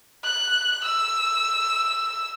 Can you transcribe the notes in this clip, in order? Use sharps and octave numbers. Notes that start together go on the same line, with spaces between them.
F#6
E6